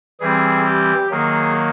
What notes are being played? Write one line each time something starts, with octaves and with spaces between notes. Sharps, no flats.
E3 G3 C4 G#4
G4
D#3 F#3 A#3 G#4